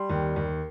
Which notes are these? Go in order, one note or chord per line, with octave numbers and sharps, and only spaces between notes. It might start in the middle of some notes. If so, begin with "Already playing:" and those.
Already playing: G3 C6
D#2
D#2